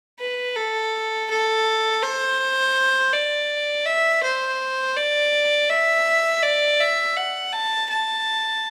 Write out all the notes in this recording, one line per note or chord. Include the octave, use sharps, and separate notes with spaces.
B4
A4
A4
C5
D5
E5
C5
D5
E5
D5
E5
F#5
A5
A5